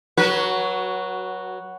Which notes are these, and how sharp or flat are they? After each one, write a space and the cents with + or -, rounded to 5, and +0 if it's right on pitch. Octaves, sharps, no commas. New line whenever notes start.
F#3 +0 F#4 +15 B4 -30